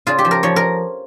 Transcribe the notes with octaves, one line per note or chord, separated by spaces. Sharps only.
C#3 F4
G4
F3
A#4
F3 C#5
A#4